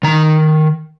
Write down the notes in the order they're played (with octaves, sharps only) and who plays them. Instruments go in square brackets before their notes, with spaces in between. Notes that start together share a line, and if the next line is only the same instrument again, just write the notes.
[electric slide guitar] D#3 A#5